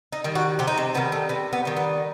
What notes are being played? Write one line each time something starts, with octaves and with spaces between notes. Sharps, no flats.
D#4
D#3 G3
F#4
C3 G4
D#4
C4
D#3 G3 B3
A3
C3 B3
B3
D#3 G3
B3